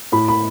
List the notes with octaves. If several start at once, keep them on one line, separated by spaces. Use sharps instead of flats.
A2 B5
B5